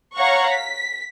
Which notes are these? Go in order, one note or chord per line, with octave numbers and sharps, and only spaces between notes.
C#5 F5 F#5 A#5 C#6
B6